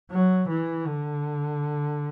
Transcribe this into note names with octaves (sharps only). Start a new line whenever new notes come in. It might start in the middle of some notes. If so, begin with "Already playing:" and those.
F#3
E3
D3